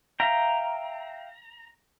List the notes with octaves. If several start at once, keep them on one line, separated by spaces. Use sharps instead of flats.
E5 F5 G5 A#5